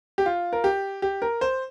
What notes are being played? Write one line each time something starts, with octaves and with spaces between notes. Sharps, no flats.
G4
F4
A#4
G4
G4
A#4
C5